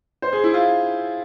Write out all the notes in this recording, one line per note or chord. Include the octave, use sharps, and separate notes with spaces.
C5
G#4
E4
F4